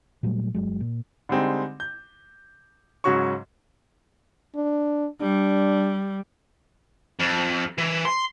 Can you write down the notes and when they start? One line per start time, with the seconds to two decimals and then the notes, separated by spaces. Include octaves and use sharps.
0.23 A#2 F#3 G3 A3
0.55 G1 F#3 G#3
0.81 A#2
1.29 D3 G3 G#3 C4 D#4
1.80 G6
3.04 G#2 C#3 F#3 F#4 C#5 C#6
4.55 D4
5.21 G3 D4
7.20 F2
7.78 E3
8.05 C6